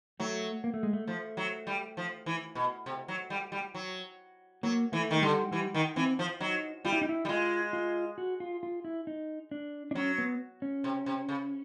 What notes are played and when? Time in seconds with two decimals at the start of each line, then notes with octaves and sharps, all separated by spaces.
0.20 F#3 A3
0.64 A#3
0.74 A3
0.83 G#3
0.93 A3
1.08 F3 A3
1.37 F#3
1.67 G3
1.97 F3
2.26 E3
2.55 B2
2.86 C3
3.08 F#3
3.30 G3
3.52 G3
3.75 F#3
4.63 F#3 A#3
4.92 E3 A3
5.11 D#3
5.22 D3 G3
5.51 E3 G3
5.74 D#3
5.96 E3 C4
6.19 F3
6.40 F#3 D#4
6.85 G3 F4
6.92 E4
7.01 D#4
7.09 E4
7.25 G3
7.29 G#3 F4
7.73 F4
8.18 F#4
8.40 F4
8.63 F4
8.85 E4
9.07 D#4
9.51 D4
9.91 D4
9.95 F#3 C#4
10.18 B3
10.62 C#4
10.84 C3
11.06 C3
11.29 C#3